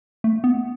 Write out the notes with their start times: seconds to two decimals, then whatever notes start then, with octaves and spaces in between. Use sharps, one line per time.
0.24 A3
0.44 B3